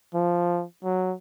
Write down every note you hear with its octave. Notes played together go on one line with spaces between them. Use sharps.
F3
F#3